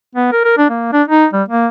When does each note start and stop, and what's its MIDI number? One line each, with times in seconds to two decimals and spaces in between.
0.15 0.29 59
0.32 0.40 70
0.44 0.56 70
0.57 0.66 62
0.69 0.92 58
0.93 1.03 62
1.08 1.26 63
1.33 1.43 55
1.48 1.68 58